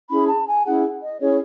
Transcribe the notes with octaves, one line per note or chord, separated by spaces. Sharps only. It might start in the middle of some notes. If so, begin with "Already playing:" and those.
C#4 E4 G#4 B5
A5
G#5
C#4 E4 G#4 F#5
D#5
C#4 E4 G#4 C#5